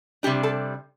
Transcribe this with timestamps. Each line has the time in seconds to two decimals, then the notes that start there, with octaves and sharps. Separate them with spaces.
0.23 C3 G3 D4 G4
0.43 A4